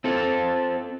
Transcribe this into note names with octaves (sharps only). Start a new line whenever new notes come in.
C4 F4 A4